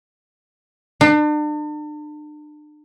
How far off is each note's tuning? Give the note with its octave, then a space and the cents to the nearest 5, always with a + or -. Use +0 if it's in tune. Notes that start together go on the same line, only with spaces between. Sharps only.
D4 +40